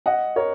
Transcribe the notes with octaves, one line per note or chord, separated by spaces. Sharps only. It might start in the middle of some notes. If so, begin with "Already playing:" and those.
D#5 F#5
A#4 C#5